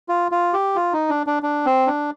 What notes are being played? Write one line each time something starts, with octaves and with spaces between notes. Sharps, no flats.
F4
F4
G4
F4
D#4
D4
D4
D4
C4
D4